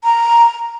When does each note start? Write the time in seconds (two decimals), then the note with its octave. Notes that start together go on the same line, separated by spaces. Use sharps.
0.04 A#5